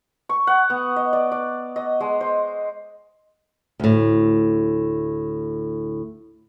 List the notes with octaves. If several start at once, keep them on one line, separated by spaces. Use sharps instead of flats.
C#6
F#5
B3
D#5
D5
D5
D#5
G#3
C5
D2 A2